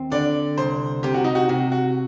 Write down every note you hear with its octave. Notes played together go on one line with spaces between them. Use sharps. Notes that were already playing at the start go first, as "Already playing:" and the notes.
Already playing: D#2 C4
D3 D5
C2 C5
C3 G4
F#4
D#4
F#4
C3 F#4
F#4